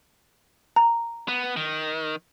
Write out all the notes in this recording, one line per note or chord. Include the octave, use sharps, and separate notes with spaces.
A#5
B3
D#3